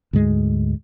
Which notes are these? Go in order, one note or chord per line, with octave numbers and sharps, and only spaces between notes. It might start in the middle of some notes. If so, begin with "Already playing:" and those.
D2 G#2 G#3